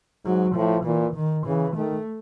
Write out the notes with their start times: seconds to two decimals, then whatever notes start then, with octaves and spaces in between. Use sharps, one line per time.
0.25 G#2 F#3
0.55 A2 F3
0.85 A#2 E3
1.15 D#3
1.46 C#3 E3
1.76 D#3 A3